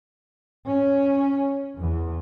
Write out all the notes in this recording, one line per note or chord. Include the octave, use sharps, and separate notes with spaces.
C#4
E2